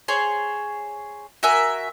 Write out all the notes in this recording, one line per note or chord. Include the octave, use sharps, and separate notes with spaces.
G#4 C5 C#5
F#4 A#4 E5 G#5